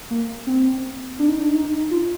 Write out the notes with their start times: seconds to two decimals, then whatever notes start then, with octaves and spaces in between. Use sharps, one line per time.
0.10 A#3
0.47 C4
1.19 D4
1.29 D#4
1.39 D4
1.55 D#4
1.91 F4